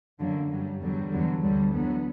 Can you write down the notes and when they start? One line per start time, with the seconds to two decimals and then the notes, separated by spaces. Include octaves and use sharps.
0.19 F#2 D3 F#3 A#3
0.51 G2 F#3 G3
0.81 E2 D3 F#3 G3
1.12 E2 D3 F#3
1.42 D2 D3 F#3 G3
1.73 E2 D3 F#3 B3